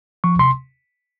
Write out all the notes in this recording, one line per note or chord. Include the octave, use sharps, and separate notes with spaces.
F3 C#6
C3 C6